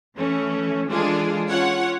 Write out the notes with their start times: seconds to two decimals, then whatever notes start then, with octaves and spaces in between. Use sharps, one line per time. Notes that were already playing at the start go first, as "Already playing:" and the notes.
0.15 E3 A3 C#4
0.89 E3 G#3 D4 F4 G#4 A4
1.49 C#4 F4 C#5 F#5